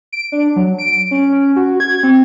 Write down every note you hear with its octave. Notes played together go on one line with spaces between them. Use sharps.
D7
D4
F#3
D7
C#4
C#4
F#4
G#6
C4